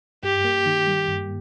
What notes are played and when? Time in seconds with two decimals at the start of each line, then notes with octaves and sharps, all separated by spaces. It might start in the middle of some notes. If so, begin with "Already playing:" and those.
0.23 G2 G4
0.45 A#3
0.66 D#3
0.87 G3
1.08 G2